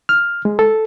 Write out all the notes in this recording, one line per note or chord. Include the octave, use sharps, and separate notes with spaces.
F6
G#3
A4